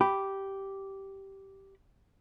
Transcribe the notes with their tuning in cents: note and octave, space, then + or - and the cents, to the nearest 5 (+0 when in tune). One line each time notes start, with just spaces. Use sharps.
G4 -10 B5 +0